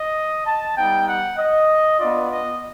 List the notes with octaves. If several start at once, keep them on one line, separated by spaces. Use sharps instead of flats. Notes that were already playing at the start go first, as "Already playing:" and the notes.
Already playing: D#5
A5
G3 B3 D#4 G5
F#5
D#5
B3 D4 F4 D5
D#5